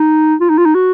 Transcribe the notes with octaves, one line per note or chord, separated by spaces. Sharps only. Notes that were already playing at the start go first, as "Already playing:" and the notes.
Already playing: D#4
F4
D#4
F4
D#4
F#4